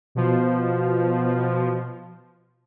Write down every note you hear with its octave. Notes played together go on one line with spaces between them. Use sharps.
B2 F3